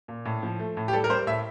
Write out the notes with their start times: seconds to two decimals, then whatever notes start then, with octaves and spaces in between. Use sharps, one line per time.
0.08 A#2
0.25 A2
0.43 F3
0.59 A3
0.77 A2
0.88 G4
0.93 G3 A4
1.04 A#4
1.10 G3 C5
1.27 A2 E5